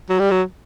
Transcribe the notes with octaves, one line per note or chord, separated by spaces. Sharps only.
F#3
G3
F#3